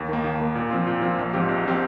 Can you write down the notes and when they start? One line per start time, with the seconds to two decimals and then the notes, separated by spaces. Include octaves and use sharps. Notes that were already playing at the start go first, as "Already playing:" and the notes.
Already playing: D#2
0.09 D#3 A#3
0.24 D#2
0.40 D#3 A#3
0.55 A#2
0.71 F3 C4 F4
0.87 A#2
1.02 F3 C4 F4
1.18 A#1
1.33 G#2 F3 C4 G4
1.49 A#1
1.66 F3 C4 G4